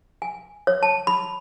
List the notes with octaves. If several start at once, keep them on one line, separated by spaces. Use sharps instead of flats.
G#5
C#5
A5
B5